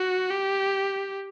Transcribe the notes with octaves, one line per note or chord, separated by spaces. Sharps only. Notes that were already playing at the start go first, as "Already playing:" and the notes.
Already playing: F#4
G4